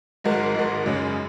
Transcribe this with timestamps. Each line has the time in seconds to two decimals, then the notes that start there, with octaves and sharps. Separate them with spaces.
0.24 G#1 G#2 G#3 F#4 A#4
0.55 G#1 G#2 G#3 F#4 A#4
0.86 F#2 C#3 G#3 C#4